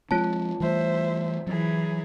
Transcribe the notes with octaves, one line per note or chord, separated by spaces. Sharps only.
F3 G#3 C4 F4 C#5 A5
E3 G3 A3 C5 E5
E3 F#3 E4 G#4